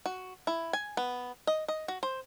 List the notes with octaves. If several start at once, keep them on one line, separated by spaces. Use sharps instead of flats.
F#4
E4
G#5
B3
D#5
D#5
F#4
C5